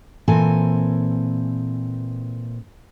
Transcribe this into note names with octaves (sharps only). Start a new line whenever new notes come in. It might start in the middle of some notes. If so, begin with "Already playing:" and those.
A#2 E3 C4 A4 G#5